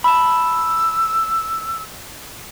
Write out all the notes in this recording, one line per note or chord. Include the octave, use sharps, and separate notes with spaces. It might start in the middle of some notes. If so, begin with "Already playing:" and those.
A5 B5 E6